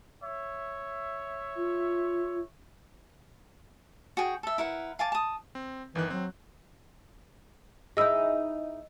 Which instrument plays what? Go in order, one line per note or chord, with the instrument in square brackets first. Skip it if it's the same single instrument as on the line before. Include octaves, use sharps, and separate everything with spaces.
[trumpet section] C#5 E5
[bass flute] F4
[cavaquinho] F#4 G#4 G5
A4 E5
E4 A#4 B4 F#5
F5 G#5 A5 D6
A5 D#6
[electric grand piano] C4
[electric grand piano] G1 D#3 F#6 [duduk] E3
[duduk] F#3 [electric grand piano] C4
[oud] D#4 E4 G#4 [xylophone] D#5 E6